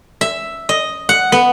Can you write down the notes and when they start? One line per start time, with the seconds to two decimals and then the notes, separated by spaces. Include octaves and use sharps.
0.21 E5
0.69 D#5
1.09 F#5
1.32 B3